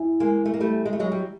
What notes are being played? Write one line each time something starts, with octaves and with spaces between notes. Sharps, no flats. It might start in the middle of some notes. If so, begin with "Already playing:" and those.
Already playing: E2 E3
G#3 A#3
A3
A#3
G3 A3
G#3
A3
F#3 G#3
G3